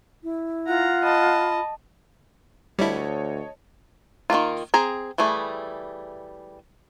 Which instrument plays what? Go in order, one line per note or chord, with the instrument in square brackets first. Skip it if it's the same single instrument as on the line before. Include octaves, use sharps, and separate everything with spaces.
[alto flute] E4
[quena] F4 [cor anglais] F#5 [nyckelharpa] A#5
[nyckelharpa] D#5 A5 [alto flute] B5
[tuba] D2 [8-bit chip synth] G3 E4 [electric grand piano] C#5 D#5 A5
[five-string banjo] D#3 A3 A#3 F4
C4 G#4 A#5
E3 G3 A3 G#4